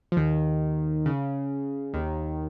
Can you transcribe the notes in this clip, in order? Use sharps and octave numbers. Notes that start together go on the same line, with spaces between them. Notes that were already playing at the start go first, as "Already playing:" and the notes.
F3
D#2 D#3
C#3
D#2 D#3